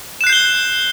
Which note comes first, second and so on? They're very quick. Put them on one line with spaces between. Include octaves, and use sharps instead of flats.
E7 F#6 C7 G6 G7